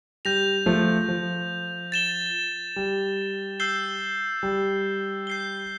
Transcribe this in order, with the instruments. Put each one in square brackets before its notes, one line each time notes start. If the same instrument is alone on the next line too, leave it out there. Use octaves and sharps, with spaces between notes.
[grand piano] G3 [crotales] G6 A#6 F7
[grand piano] F3 A3
F3
[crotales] A6 E7 G7
[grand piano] G3
[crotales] E6 G6 C7 G7
[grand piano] G3
[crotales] G6 C7 G7